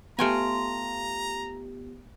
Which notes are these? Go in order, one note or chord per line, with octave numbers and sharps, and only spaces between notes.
A3 B3 F4 G4 G5 G#5 A#5